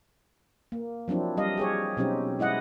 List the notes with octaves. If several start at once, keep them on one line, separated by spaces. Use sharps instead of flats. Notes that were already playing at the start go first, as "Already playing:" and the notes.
A#3
F3 F#3 C4 D4 E4
G3 D#5 F5
G4 G#4 C#5
B2 F#3 C4 C#4 D#4 G4
G#3 E4 D#5 F#5